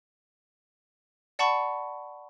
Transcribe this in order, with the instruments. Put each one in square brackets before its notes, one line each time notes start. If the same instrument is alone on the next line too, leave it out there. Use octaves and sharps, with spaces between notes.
[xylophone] D5 F#5 A5 B5 C#6